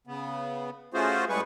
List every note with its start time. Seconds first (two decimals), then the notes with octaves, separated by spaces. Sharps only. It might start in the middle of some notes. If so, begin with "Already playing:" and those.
0.07 C#3 B3
0.94 A3 C#4 F4 F#4 G#4 C5
1.29 A2 G3 G#3 G#4 B4 C#6